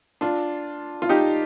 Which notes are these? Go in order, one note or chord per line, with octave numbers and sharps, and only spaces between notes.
D4 F4
F4
D#4 G4